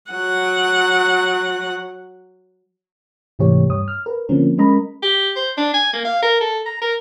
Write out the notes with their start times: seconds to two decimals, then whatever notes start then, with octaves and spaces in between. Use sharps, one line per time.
0.11 F#3 F#5
3.39 G#2 C3 E3 A3 G4 C#5
3.70 G2 C#5 D#6
3.88 F6
4.06 A#4 B4
4.29 D3 F3 A#3 C4 C#4 A#4
4.58 G#3 C#4 A#4 D#5 A#5 B5
5.03 G4
5.36 C5
5.57 D4
5.74 G#5
5.93 A#3
6.05 F5
6.23 A#4
6.41 A4
6.66 A#5
6.82 A#4